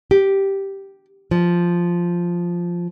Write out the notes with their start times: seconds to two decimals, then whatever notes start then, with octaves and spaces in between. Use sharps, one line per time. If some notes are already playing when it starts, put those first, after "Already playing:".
0.11 G4
1.31 F3